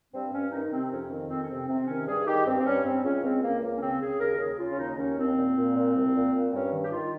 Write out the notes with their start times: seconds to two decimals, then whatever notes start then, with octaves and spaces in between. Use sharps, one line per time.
0.13 G2 C4
0.32 G2 C#4
0.51 D#3 D#4
0.71 C3 C4
0.90 F2 C#4
1.10 D#3
1.29 F2 C4
1.43 C#4
1.48 C3 C4
1.68 C3 C4
1.87 D#3 C#4
2.07 G2 G#4
2.26 D#3 G4
2.46 G2 C4
2.58 C4
2.65 G2 C#4
2.84 G2 C4
3.04 C#2 C#4
3.23 C#2 C4
3.43 C#2 A#3
3.62 C#2 A#3
3.76 C#4
3.81 C#3 C4
4.00 C#3 G#4
4.20 D#2 A#4
4.39 C#3 G#4
4.59 C#3 F4
4.71 C#4
4.78 D#2 D#4
4.98 D#2 C#4
5.17 D#2 C4
5.37 A#2
5.56 A#2
5.75 A#2
5.95 C2
6.14 A#2
6.34 A#2
6.53 G2 C#4
6.72 D#3
6.83 G4
6.91 D#3 F4